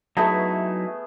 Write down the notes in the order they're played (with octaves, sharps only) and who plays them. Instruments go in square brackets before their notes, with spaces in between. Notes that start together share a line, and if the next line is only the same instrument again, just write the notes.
[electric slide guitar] F#3 D#4 E4 [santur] A3 B3 G#4